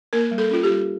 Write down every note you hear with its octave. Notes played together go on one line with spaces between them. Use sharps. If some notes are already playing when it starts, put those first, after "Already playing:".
A#3 A#4
G3
A4
C#4 F4
G4
G3